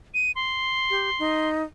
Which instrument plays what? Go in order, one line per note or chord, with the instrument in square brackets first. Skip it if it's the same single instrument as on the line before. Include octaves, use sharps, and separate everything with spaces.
[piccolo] D#7
C6
[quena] G4
D#4